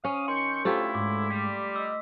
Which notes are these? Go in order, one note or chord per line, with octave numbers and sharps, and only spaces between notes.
C#4 F5 D#6
D#3 C6 C#6 G6
D2 A2 A3 E4 F4 G4 C5
G#2 D6
G3 B6
D#5 E6